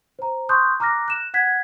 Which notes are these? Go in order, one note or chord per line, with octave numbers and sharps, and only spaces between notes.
C5 A#5
A5 C6 C#6 D#6 F#6 G6
A#5 D6 F6 F#6 A#6
F#6 E7
F#5 F#6 G#6 B6